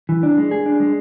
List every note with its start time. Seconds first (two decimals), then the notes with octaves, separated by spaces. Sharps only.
0.09 E3
0.23 D4
0.38 G#3
0.51 G#4
0.66 D4
0.80 G#3